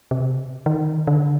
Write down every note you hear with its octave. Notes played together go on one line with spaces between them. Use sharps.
C3
D#3
D3